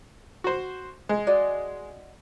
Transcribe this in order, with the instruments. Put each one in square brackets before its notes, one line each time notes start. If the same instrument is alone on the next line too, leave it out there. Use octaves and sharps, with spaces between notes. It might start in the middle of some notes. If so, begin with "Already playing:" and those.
[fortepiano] F#4 C5
G#3
[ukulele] F#4 D5 D#5